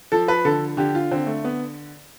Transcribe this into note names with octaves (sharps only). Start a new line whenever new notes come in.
F3 A4
B4
D3 A4
D3 G4
F4
D3 C4
A3
B3